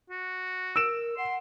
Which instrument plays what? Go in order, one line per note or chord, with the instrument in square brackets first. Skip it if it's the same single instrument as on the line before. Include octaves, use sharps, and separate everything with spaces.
[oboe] F#4
[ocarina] A#4 [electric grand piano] E6 D7 E7
[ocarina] F#5 [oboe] C6